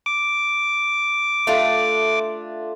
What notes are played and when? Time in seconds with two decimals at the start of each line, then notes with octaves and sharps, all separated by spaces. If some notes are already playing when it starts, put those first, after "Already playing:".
0.06 D6
1.47 A3 D4 F4